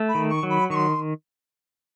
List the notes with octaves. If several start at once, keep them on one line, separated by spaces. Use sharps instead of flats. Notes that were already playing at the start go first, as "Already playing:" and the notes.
Already playing: A3
B5
D#3
C#6
F#3
B5
D#3 C6 C#6